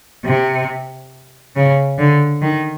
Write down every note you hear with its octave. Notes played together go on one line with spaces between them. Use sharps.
C3
C#3
D3
D#3